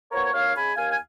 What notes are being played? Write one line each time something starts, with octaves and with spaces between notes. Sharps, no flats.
F3 B3 A#4 C#5
D#2 C#5 F5
C#3 G#3 G#5 B5
D#2 F5 G#5
G#5